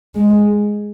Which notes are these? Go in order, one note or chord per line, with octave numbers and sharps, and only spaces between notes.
G#3